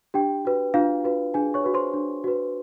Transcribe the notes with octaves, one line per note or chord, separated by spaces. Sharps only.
D4 G4 G5
F#4 B4
D4 F4 F5
F#4 B4
D4 G#4 G#5
C#5 C#6
F#4 B4
C5 C6
D4
F#4 B4